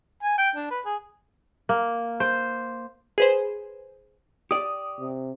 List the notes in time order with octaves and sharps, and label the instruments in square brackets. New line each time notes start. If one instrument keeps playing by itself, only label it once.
[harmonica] G#5
G5
D4
B4
G#4
[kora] A#3
C5
[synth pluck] G#4 B4 C5
[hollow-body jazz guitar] G4 D5 [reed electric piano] D#6
[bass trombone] C3